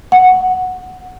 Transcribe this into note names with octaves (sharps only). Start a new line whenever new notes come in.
F#5